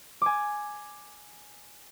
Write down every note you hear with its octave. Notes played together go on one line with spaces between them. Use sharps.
G#5 D6